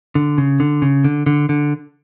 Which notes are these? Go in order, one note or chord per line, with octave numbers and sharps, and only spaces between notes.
D3
C#3
D3
C#3
D3
D3
D3